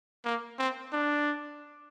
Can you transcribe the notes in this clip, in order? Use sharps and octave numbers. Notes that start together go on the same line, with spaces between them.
A#3
C4
D4